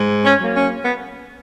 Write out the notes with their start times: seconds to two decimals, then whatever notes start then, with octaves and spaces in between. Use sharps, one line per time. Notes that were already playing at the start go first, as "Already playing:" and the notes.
Already playing: G#2
0.24 C#4
0.39 F#3 A#3
0.55 C#4
0.85 B3